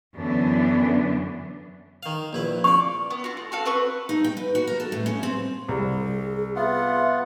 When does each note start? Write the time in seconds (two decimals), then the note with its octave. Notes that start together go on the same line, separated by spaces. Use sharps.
0.14 F#2 D3 E3 B3 D4
2.03 D#3 F5
2.33 A#1 E4 B4
2.64 D5 F5 C#6
3.11 B3
3.24 F4 F#4
3.37 A3
3.52 F#4 A4 F5
3.65 C4 B4 C#6
4.09 D#4
4.24 G5
4.37 B4
4.55 F#4
4.67 A#4
4.80 A4
4.92 A2
5.06 C#4
5.23 C4
5.68 C2 G#4
6.56 B3 F4 E5 F#5